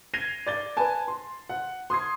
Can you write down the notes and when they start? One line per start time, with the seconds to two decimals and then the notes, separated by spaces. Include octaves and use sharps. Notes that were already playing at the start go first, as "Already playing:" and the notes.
0.14 G#6 A#6 C7 D#7 F7 G7
0.47 D5 A6 G7
0.77 B4 G#5 A5
1.08 C6
1.49 F#5
1.90 C6 D#6 G#6 C7